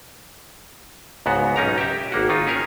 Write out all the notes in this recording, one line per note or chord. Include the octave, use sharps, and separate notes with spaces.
C#2 G#2 B3 F#4
B1 C#4 D#4 A#4 A#5
G4 E5
G#1 A#3 F#4
D#3 D#4 F4
C#4 G#4 A#4 C#5